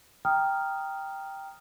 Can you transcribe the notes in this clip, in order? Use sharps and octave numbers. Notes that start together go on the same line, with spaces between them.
G5 A#5 D#6 F6